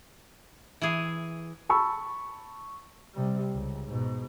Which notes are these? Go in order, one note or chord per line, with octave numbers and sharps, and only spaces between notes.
E3 G#4
A5 B5 C#6 E6
C3 G3
C#2
G#2 B2